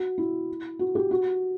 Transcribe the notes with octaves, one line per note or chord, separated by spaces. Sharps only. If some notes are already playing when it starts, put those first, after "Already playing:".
Already playing: F#4
E4
F#4
G4
F#4